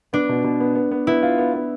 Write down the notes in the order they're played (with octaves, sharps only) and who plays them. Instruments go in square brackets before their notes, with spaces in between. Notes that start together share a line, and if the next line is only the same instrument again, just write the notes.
[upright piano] B3 [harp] D4
[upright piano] B2
B2
B3
B3
B3
[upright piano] B3 [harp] E4
[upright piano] F4
B3
B3